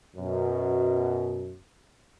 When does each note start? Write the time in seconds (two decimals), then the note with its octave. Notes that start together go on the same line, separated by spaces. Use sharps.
0.16 F#2 B2